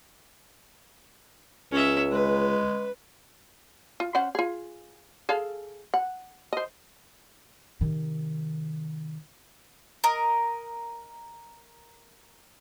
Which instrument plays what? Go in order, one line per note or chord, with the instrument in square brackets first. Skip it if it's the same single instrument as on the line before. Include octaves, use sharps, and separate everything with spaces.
[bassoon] C#2 [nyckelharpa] C#4 E5
[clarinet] G#3 [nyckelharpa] B4
[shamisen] F4
C#4 C5 F#5
F4 G#4
G#4 A4 F5
F#5
C5 D#5
[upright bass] C3 D#3
[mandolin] A#4 D#5